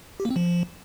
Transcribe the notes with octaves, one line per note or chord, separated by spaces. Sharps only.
G4
A#3
C4
F3